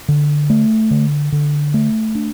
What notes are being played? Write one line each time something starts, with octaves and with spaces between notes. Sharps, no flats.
D3
A3
D3
D3
A3
D4